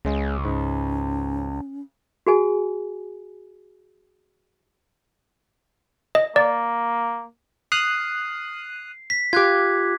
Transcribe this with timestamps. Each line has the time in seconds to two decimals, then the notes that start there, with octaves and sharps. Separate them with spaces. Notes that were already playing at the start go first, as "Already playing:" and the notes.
0.05 C#2 C#3 G#3
0.45 G#2 C#4
2.27 F#4 G#4 G#5
6.15 D#5
6.36 A#3 D5
7.72 D#6 F6 F#6 C7
9.10 B6
9.33 F4 G4 D6 F#6 G#6